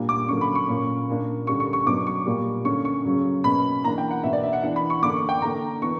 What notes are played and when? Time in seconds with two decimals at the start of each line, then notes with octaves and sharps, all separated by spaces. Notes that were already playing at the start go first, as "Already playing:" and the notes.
Already playing: A#2 G3 A#3 D4
0.09 D6
0.28 D3 F#3 A#3 C#4 C#6
0.41 B5
0.55 C#6
0.68 A#2 A#3 C#4
1.08 A#2 A#3 D4
1.47 D3 G3 C#4 C#6
1.60 C#6
1.73 C#6
1.86 B2 F#3 B3 D4 D6
2.07 C#6
2.26 A#2 G3 A#3
2.65 D3 A#3 C#4 C#6
2.85 C#6
3.05 C#3 F#3 C#4
3.44 B2 A#3 C#4 B5
3.84 E3 A#3 D4 A#5
3.98 G5
4.11 F#5
4.23 B2 A#3 D4 E5
4.33 D5
4.43 E5
4.53 F#5
4.63 E3 B3 D4 F#5
4.76 B5
4.90 C#6
5.02 D3 A#3 D4 D6
5.16 C#6
5.29 G5
5.42 D3 A#3 D4 A#5
5.81 E3 B3 D4 C#6